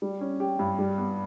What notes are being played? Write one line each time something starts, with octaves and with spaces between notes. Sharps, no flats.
G3
C#4
G4
G2
G3
B3